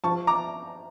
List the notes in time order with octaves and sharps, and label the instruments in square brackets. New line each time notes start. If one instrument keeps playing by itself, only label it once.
[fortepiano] F3 A5 C#6
A#5 D6